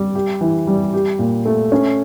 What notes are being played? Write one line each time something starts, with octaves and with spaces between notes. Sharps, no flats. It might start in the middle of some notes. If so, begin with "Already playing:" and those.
Already playing: G3
G4
E3
G3
G4
A#2
A3
C#4